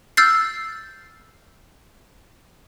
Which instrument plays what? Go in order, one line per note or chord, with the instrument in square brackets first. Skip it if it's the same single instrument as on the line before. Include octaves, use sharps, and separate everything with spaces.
[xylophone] E6 F6 G6 A6 C7